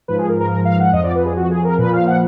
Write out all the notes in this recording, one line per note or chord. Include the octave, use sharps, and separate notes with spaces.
G#2 F3 B4
G#4
A#4
A#4
A#4
F5
F#5
F2 F3 D#5
D5
B4
G#4
F#4
G#4
A#4
A#2 F3 B4
F5
F#5